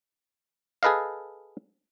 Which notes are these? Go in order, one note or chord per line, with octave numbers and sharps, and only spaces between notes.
G#4 A4 B4 D#5 F5